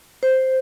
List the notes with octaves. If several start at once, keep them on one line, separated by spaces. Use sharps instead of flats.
C5